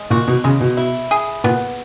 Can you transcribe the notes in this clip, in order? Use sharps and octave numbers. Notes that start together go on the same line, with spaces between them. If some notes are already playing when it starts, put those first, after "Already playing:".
Already playing: G#3
A#2 F#4
B2
C#3 G#3
B2
E4
G#4
A#2 B3